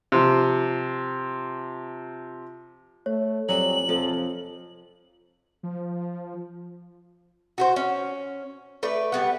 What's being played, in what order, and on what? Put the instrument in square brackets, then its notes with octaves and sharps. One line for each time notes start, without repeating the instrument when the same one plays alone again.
[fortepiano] C3 F3
[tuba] A3 [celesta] C#5
[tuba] F2 [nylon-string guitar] F#3 G3 G#5 [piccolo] F#7
[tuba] F2 [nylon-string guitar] C3 F3 A4
[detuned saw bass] F3
[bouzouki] F#4 G4 C5
C#4
A3 B4 D5
G3 B3 F#5